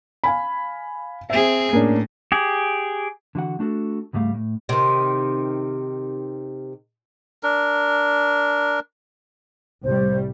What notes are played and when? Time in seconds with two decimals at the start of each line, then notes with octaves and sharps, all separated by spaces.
0.24 F5 G#5 B5
1.30 C4 G#4 E5
1.73 A2 A#3 C#4 D4
2.32 G4 G#4
3.35 D3 E3 F#4 F#5
3.59 A3 D4 F#4 A4
4.13 C#2 G#2 G3 A3 F5
4.34 A2
4.69 C3 D#3
7.43 D4 A#4
9.83 C2 A2 G3 C5